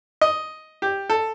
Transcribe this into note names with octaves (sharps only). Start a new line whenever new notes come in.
D#5
G4
A4